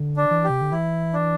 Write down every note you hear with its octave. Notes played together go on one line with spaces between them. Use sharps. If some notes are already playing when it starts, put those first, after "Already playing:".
Already playing: D3
D4
E3
G4
C3
D3
E3 E4
D4